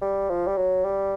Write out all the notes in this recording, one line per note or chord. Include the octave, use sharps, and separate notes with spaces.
G3
F3
G3
F#3
G3